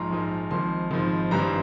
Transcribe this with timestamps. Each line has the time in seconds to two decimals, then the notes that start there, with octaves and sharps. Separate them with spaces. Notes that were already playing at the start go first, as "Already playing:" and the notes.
Already playing: A#1 G#2 F3 A#5 C6
0.10 A#1 G#2 F3
0.51 G#1 G#2 F3 C6
0.91 G#1 G#2 F3
1.31 G#1 G2 E3 G3 C4 A#5